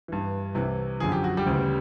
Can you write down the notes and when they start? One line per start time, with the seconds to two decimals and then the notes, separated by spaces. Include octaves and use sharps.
0.08 G2 E3
0.54 C2 C3 E3
1.00 F#2 D3 F3 G#4
1.12 G4
1.24 F#4
1.37 G3 G4
1.46 D2 C#3 E3